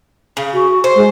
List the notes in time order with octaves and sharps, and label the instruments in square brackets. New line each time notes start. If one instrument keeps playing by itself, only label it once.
[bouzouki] C#3
[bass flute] F#4
[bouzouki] C5
[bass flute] G#3